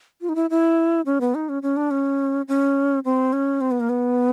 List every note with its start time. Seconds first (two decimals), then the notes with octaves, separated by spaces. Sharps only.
0.21 F4
0.29 D#4
0.36 E4
0.50 E4
1.06 C#4
1.21 B3
1.35 D#4
1.49 C#4
1.63 C#4
1.77 D4
1.91 C#4
2.48 C#4
3.05 C4
3.33 C#4
3.61 C4
3.71 B3
3.80 A#3
3.89 B3